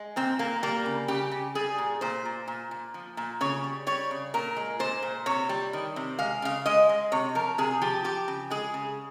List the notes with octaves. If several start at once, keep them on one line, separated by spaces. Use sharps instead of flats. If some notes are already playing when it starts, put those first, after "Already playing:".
Already playing: G#3
A#2 C4
A#2 A#3
G3 A#3
C#3
C#3 G4
C#3
G3 G#4
A#2
A#2 C5
A#2
A#2
A#2
F3
A#2
C#3 C#5
G3
G3 C#5
C#3
A#2 A#4
G#3
A#2 C5
A#2
C3 C#5
G3
D#3
C3
G#3 F5
C#3 F5
G#3 D#5
G#3
C3 C#5
F3 A#4
C3 G#4
F3 G4
F3 G4
C#3
G#3 G#4
C#3